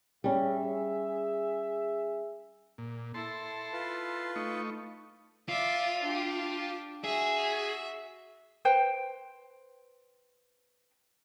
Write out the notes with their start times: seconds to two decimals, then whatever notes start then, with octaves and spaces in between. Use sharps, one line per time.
0.24 G3 C#4 G#4 E5
2.78 A#2
3.14 E4 A4 A5 C6
3.73 F4 B4
4.36 A3 D#4 C#6
5.49 F4 D5 E5
6.03 D4 G4
7.04 F#4 G#4 E5
8.65 B4 C5 G5